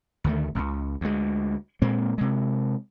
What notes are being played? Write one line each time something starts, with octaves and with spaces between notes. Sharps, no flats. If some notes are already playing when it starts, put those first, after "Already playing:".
D2 D#3 A3
E1 C#2
D2 G#3
A#2 G#3 A#3 C4
C3 G#3